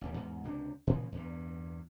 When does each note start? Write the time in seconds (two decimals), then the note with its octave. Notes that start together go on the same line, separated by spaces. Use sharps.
0.01 A1 D#2 G3
0.14 E2 G#2
0.44 C#2 C3 D4
0.87 A#2 C#3 E3 F3
1.12 E2 G2